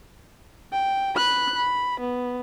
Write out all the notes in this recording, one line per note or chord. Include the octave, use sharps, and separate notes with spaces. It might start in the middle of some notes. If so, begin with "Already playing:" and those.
G5
B5 F#6
B5
B3